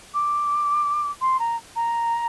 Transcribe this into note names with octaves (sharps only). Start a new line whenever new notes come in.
D6
C6
A#5
A#5